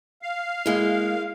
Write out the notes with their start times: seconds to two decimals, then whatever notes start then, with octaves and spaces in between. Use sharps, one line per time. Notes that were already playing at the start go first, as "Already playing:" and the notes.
0.22 F5
0.66 G#3 A#3 E4 G#4